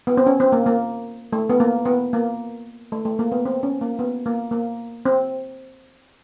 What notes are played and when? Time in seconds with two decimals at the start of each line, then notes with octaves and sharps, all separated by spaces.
0.07 B3
0.17 C4
0.27 C#4
0.40 C4
0.52 A#3
0.66 A#3
1.33 A3
1.50 B3
1.60 A#3
1.85 B3
2.13 A#3
2.92 A3
3.05 A3
3.19 A#3
3.32 B3
3.45 C4
3.63 C#4
3.81 A#3
3.99 B3
4.26 A#3
4.51 A#3
5.05 C4